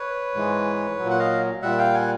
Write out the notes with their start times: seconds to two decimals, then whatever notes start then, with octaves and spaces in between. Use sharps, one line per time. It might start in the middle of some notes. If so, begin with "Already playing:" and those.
Already playing: B4 C#5
0.35 G#2 E3 G#3
0.99 A#2 F#3
1.10 F#5
1.19 D#5 F5
1.62 A#2 G3 E5 F#5
1.78 F5 G5
1.94 F#5 G#5